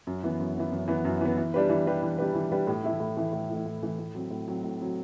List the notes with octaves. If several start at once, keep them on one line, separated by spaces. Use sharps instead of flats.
F#2
E3 B3
F#2
E3 B3
F#2
E3 B3
F#2
E3 B3
E3
G3 D4 G4 B4
E3
G3 D4 G4 B4
E3
G3 D4 G4 B4
E3
G3 D4 G4 B4
A2
E3 A3 E4
A2
E3 A3 E4
A2
E3 A3 E4
A2
E3 A3 E4
A2
F#3 C4
A2
F#3 C4
A2
F#3 C4